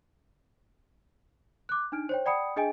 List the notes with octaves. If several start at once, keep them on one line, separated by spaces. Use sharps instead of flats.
D6 F#6
D4 D#4 F6 D7
C5 C#5 G5
D5 F#5 G5 B5 D#6 C#7
D4 G#4 D#5 G5 G#5 D7